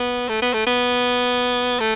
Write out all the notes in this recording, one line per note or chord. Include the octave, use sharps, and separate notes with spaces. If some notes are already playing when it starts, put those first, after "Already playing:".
Already playing: B3
A3
B3
A3
B3
A3